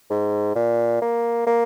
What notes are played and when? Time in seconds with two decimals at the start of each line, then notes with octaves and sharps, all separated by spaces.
0.10 G#2
0.55 A#2
1.02 A#3
1.47 A#3